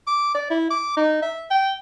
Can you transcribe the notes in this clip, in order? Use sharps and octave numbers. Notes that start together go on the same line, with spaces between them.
D6
D5
E4
D6
D#4
E5
G5